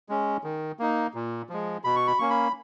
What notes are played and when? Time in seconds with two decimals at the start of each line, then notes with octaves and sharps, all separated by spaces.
0.09 G#3 C#4
0.44 D#3
0.79 A#3 D#4
1.14 A#2
1.49 F3 G#3
1.84 B2 B5
1.96 C#6
2.07 B5
2.19 A#3 C#4 C#6
2.30 B5